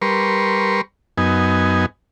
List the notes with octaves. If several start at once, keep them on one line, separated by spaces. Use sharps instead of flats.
G3 A#4 B4 C6 C#6
F#2 B3 D#4 G#5